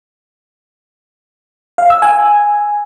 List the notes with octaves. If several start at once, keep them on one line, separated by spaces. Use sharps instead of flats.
F5
E6
G#5